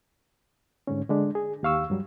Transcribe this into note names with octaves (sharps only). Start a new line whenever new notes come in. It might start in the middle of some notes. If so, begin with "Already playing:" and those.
G#2 D3 C#4
D3 G#3 D4
G#4
D#2 G4 F5 C#6 E6
G2 F#3 G3